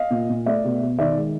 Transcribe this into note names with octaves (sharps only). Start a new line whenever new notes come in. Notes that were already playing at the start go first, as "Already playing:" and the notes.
Already playing: D#5 F5
A#2
A#2
A3 D5 E5
B2
B2
D#3 D5 E5
G#3